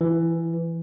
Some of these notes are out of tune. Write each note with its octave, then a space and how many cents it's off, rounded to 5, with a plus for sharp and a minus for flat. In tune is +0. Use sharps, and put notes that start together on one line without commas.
E3 +10